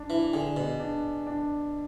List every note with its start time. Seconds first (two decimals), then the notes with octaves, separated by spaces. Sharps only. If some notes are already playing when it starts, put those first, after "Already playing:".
Already playing: D4
0.10 E3
0.33 D3 G#4
0.57 B2
0.80 D4
1.27 D4